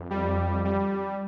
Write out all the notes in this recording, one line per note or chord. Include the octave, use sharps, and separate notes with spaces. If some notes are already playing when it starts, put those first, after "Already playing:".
Already playing: F2
G3
G3